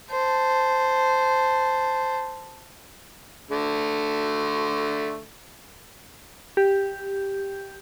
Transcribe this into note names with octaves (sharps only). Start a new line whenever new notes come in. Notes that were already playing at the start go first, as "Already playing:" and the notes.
C5 A5
D3 A3
G4